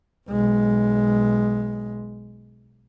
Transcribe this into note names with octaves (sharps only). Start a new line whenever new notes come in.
B1 G#3